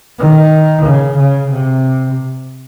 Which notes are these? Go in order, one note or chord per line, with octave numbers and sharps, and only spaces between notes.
D#3
C#3
C#3
C3